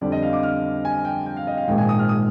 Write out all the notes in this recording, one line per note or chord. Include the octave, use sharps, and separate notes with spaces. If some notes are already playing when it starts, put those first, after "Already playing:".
F2 D3 G3 D5
D#5
F5
D6
F6
G#5
G5
G5
F5
D#5
F5
A#1 G#2 D#3 G#3 G5
G#5
D#6
F6
D#6